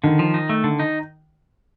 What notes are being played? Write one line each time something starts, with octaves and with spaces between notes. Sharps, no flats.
D3 D#3
F3
D#4
A3
D3
D#4